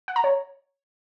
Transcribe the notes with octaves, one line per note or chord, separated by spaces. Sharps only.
F#5
A#5
C#5